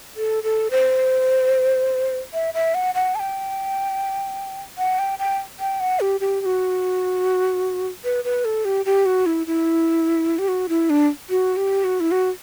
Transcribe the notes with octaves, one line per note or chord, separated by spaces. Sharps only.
A4
A4
C5
E5
E5
F#5
F#5
A5
G5
F#5
G5
G5
G5
F#5
G4
G4
G4
F#4
B4
B4
A4
G4
G4
F#4
E4
E4
G4
F#4
E4
D4
F#4
G4
F#4
E4
F#4